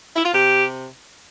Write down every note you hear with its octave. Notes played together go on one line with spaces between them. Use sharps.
E4
F4
C3 G4